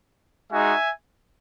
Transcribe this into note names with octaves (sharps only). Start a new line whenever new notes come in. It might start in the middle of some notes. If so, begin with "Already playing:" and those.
G#3 D#4 F#4 E5 G#5